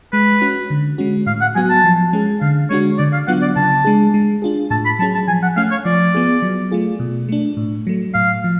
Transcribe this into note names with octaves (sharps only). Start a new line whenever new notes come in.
G#3 B4
C#4 F#4
D3
G#3 C#4 F#4
A2 F5
F#5
F#3 B3 F#4 G#5
A5
F3
G#3 C#4 G#4
D3 F5
G#3 D4 F#4 C#5
D3 D5
F5
F#3 B3 D4 F4 F#5
D5
C#3 A5
G#3 D4 G#4
G#3
D4 F4 G#4
A2 A5
B5
F#3 C#4 G#4 A5
A5
F3 G#5
F#5
A3 C#4 F5
C#5
F3 D5
B3 F4 G#4
F#3
A3 F4 G#4
B2
A3 D4
A2
F#3 A3
A2 F5
F3